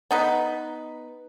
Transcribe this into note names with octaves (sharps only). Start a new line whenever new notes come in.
B3 D#4 B4